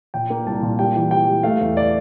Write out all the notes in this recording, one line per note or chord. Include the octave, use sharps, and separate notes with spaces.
A#2 G5
A#3
C2 A5
A#2
G3 G5
E3
G3 G5
G3
A3 F5
E2
D5